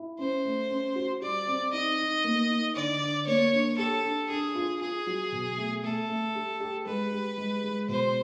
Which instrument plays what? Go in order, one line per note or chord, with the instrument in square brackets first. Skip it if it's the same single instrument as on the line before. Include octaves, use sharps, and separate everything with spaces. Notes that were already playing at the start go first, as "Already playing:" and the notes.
Already playing: [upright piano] E4
[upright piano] C#4 [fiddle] C5
[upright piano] A3
C#4
F#4
[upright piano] G3 [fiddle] D5
[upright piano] C4
[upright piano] D#4 [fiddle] D#5
[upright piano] D#4
A#3
D#4
[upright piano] D3 [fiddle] D5
[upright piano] D3
[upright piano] A#3 [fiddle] C#5
[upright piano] D4
[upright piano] G4 [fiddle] A4
[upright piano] D4
[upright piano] D4 [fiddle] G#4
[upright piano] F4
[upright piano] F4 [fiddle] G#4
[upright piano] F#3
B2
A3
[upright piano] A3 [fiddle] A4
[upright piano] A3
G4
G4
[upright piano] G#3 [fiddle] B4
[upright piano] G4
G#3
G#3
[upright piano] B2 [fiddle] C5